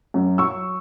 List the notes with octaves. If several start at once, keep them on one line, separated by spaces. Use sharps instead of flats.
F#2
F#3 C#6 E6